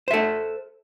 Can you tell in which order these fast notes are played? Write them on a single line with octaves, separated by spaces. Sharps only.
C5 E5 A4